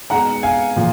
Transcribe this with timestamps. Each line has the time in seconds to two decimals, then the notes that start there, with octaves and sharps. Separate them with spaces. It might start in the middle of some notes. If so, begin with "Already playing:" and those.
0.10 B2 G#3 D#4 F#5 A#5
0.43 F5 G#5
0.76 A#2 F3